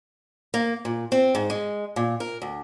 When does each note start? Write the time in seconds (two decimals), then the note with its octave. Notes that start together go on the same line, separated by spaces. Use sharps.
0.54 A#3
0.85 A#2
1.12 C4
1.35 G#2
1.50 G#3
1.96 A#2
2.20 A#4
2.42 D2